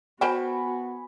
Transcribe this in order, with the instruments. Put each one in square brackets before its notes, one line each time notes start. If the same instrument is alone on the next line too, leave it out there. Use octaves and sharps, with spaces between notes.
[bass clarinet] B3 [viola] F#4 [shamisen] A#4 C5 G5 [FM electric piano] G#5 B5